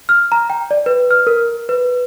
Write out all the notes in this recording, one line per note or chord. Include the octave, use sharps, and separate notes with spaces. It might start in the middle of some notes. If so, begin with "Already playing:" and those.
F6
A#5
G5
D5
B4
F6
A#4
B4